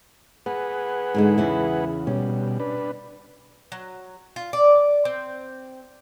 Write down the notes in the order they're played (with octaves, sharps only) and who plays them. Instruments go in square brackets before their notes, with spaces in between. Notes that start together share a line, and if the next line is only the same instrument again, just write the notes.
[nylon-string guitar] B3 [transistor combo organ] G#4 B4 F#5
[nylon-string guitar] G#2 D3 G#3
E2 C#3 E4
[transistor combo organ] B2 G3 [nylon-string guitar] C#4
[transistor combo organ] D4 B4
[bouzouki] F#3
F4
D5
C4